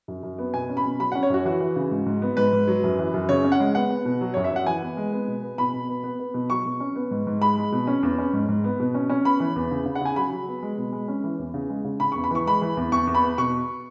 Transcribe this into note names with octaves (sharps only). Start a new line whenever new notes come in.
F#2
F#2
B3
B2 G#5
C#4
B5
B2
F#3 B5
C#4 F#5
C#5
F#2 F#4
E3 F#4
E3
C#3
G#2
G#2
B3
G#2 B4
G#2
F#3
F#2
E3
F#2
C#3 C#5
C#4
F#5
G#3
B3 F#5
B3
B2
F#3
F#2 C#5
E5
F#2 F#5
E3 G#5
B3
G#3
B3
B2
B3
B2 B5
B2
B3
B3
B3
B2
F#3 C#6
B2
C#4
B3
G#2
G#2
G#3 B5
G#3
B2
C#4
E2
C#4
G#2
G#2
B3
B2
C#4
C#4
B3 B5
E3
E2
C#3
C#3
F#5
C#3 G#5
F#3 B5
F#3
B3
G#3
B2
G#3
C#4
E3
E2
C#3
G#3
C#3
C#3 B5
E2 C#6
B5
E3 C#6
G#3 B5
E3
E2
E2 C#6
E2
B5
B3
B2 C#6